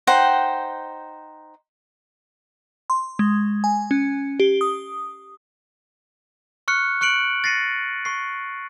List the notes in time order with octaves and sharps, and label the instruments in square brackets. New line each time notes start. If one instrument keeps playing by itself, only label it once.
[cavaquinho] D#4 C5 F#5 G5
[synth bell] C6
G#3
G#5
C#4
G4
D#6
[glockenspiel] C#6 F6 F#6 C#7
C#6 F#6 C#7 D7 F#7
A6 A#6 C7 C#7 D#7
C#6 C7